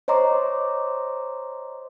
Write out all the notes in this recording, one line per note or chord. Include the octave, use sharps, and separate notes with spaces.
C5 C#5 D#5 A#5 C6 D6